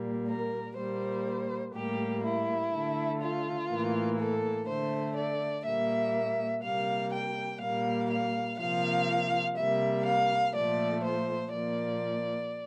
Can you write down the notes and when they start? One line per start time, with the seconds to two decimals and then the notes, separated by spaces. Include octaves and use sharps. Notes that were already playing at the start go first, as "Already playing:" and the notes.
Already playing: A#2 G3 A#3
0.28 A#4
0.76 A#2 G3 A#3 C5
1.74 A2 G3 A#3 G4
2.23 E4
2.72 D3 A3
3.21 F4
3.70 A2 E3 A#3
4.19 A4
4.68 D3 A3 C5
5.17 D5
5.65 A#2 G3 A#3 E5
6.63 C3 G3 A#3 F5
7.13 G5
7.61 A#2 G3 A#3 F5
8.10 F5
8.59 C3 F3 A#3 F5
9.57 C3 G3 A#3 E5
10.05 F5
10.54 A#2 F3 A3 D5
11.04 C5
11.52 A#2 F3 A#3 D5